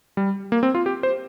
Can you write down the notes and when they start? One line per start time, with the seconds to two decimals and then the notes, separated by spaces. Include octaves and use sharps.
0.17 G3
0.52 A#3
0.63 C4
0.75 F4
0.86 G4
1.03 C5